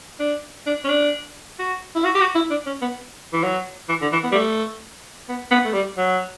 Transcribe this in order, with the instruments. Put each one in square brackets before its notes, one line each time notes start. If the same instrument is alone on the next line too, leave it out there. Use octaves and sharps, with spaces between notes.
[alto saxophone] D4
D4
C#4
D4
F#4
E4
F#4
G4
F#4
E4
D4
C#4
B3
E3
F#3
E3
D3
E3
B3
G3
A3
B3
B3
A3
G3
F#3